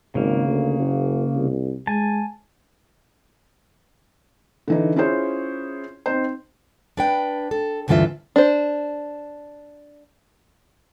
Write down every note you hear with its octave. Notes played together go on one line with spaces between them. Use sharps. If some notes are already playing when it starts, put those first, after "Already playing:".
G#1 C#3 A#3
D2
F#1
C2
G#3 G#5 A5
D3 E3 D#4
C#4 E4 F4 G#4 C5 C#5
C4 D#4 C5
D4 B4 G5
A4
D2 G2 D3 E3 F4 E5
D4 C5